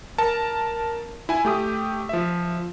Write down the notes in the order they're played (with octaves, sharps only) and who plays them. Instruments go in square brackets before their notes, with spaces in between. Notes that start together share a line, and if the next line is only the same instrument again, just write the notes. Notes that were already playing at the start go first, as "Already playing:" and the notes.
[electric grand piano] A#4 A5
E4 G#5
A3 G4 D#6
F3 E5